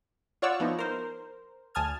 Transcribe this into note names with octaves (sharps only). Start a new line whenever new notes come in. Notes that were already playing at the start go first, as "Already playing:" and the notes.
F4 C#5 D5 F#5 C#6 E6
F3 B3 D#4 E4
A#4 C5
D2 G#5 A5 D#6 F6 G#6